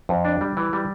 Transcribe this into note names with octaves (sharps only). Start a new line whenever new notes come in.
F2
D4
G3
E3
G3